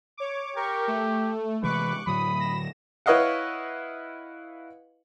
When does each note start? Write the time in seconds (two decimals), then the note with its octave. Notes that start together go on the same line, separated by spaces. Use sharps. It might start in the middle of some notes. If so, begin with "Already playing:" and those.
0.17 C#5 D6
0.56 G4 A#4 C#6
0.87 A3
1.63 C3 E3 G#3 B4 C#6 D6 F#6
2.07 A2 D3 F#3 B5 D#6
2.39 A#6 E7
3.06 E4 B4 C#5 D#5 F5 F#5